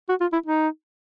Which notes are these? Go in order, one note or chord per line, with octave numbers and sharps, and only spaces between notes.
F#4
F4
E4
D#4